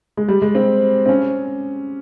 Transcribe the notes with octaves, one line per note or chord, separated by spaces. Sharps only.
G#3
G3
G#3
C4
C4
C#4